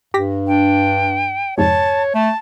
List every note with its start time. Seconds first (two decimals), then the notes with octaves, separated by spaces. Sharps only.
0.14 G2 G4 A#6 B6
0.47 D4 G5
1.58 F2 G#2 C3 C#5 A5
2.14 A3 A5